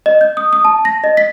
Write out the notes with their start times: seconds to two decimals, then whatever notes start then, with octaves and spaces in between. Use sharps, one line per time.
0.06 D#5
0.21 G6
0.37 D#6
0.53 D#6
0.65 A5
0.85 A#6
1.04 D#5
1.17 B6